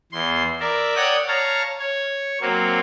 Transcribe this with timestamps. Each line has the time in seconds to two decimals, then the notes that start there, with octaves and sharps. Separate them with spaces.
0.12 E2 C6
0.60 A#4 D5 E5
0.96 C#5 D5 F#5 G5 D#6 F#6
1.27 C#5 F5 A5 A#5
1.79 C#5
2.41 F#3 A#3 C4